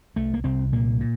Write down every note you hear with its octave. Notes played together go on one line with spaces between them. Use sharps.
C2 A3
A#3
C2 C4
A#2 A#3
A#2